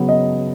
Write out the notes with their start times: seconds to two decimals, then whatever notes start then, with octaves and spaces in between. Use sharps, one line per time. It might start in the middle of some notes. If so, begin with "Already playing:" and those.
Already playing: C#3 F#3 B3
0.09 D#5